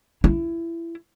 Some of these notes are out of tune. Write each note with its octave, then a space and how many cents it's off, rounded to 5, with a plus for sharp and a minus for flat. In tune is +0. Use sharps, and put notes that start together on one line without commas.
E4 +20